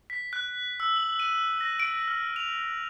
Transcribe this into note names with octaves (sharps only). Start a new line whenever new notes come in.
B6
F#6
E6
F#7
D#7
A#6
D7
F6
F7